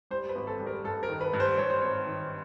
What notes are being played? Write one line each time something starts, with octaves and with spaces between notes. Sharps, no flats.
G3 C5
B4
G#1
A4
G3
A#4
G2 A4
A#4
D#3
B4
G2
C5
G2 C#5
C5
G#1 C#5
D#3